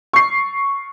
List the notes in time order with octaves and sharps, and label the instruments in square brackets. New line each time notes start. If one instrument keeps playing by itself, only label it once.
[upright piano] C#6 C7